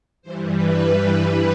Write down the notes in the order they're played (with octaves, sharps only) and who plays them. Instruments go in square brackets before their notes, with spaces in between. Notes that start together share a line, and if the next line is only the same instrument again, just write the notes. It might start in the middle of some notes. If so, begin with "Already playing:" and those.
[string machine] G2 E3 G3 C5
B4